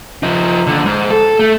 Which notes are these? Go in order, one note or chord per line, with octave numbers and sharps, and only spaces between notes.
F3 D#4
D#2 D3
G#2
A4
A3